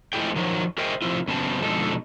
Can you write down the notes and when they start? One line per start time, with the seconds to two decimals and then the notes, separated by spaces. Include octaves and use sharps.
0.13 F3 G#3 A3 E4 G#4 G5
0.36 D#3 F3 F#3
0.78 G#4 A#4 C5 D#5 E5 G5
1.02 C3 D#3 F3 E4 F4
1.28 F#2 C#3 B3 C4 A5
1.62 B2 D3 F3 G#3 D#4 A4